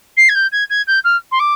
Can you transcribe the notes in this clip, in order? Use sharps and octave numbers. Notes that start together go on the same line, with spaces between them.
C7
G#6
G6
G#6
G#6
G6
F6
C6
D6